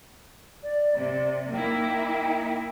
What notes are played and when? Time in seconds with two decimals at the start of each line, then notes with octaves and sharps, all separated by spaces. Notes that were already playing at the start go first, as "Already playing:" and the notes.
0.63 D5
0.95 C3 D5
1.52 A#3 D#4 E4 G5